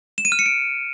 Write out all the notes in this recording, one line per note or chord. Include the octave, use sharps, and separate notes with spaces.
E7
D#7
F6
C#7
D7